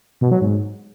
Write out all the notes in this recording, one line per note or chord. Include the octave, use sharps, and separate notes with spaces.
B2
F#3
G#2